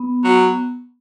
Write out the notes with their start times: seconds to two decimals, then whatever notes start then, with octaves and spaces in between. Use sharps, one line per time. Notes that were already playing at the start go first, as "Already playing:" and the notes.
Already playing: B3
0.25 F#3